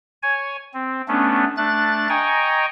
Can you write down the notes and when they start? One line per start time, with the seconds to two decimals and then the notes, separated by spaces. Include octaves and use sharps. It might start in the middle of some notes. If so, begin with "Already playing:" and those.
0.23 C#5 G#5
0.74 C4
1.08 A3 B3 C#4 D4
1.57 A3 D4 F#6 A6
2.09 D#5 G5 G#5 A#5 C#6